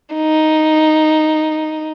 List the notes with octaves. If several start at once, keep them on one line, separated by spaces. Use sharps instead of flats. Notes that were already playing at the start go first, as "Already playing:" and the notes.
D#4